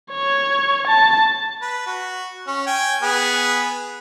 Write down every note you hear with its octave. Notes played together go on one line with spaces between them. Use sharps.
C#5
A5
B4
F#4
C#4
G5 G#5
B3 G#4